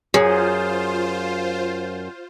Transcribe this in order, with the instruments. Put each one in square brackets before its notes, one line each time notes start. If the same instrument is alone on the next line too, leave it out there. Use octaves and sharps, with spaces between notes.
[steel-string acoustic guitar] F#2 [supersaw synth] F4 C5 [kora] G#4